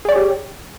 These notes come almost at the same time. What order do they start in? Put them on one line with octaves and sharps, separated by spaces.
G#4 D5 C#5 G4